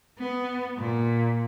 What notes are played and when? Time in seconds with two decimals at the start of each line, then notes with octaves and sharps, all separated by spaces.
0.19 B3
0.78 A#2